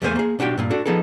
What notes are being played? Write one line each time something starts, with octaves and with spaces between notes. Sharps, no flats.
E2 A3 A#3 D#4 C5 G#5
A#3 G#4
B1 D4 F#4 G4 G5
G2 A#2 A#3
D4 F#4 A4
F3 B3 D#4 G#4 A4